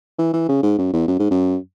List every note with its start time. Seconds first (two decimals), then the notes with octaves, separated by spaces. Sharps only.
0.19 E3
0.34 E3
0.49 C#3
0.63 G#2
0.79 F#2
0.93 E2
1.08 F#2
1.19 G#2
1.31 F#2